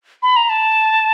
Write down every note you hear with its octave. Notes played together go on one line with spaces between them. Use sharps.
B5
A#5
A5